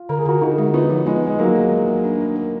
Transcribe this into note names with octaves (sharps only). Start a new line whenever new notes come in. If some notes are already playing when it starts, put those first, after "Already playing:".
Already playing: F4
D3 A#4
G#4
D3 F#4 A#4
D3 D#4 F#4
G#3
B3 D#4 F4
F3
G#3 B3 F4
G#3 F4
F#3 A#3 D#4
G#4
G#3
G#3
D4
D4
A#4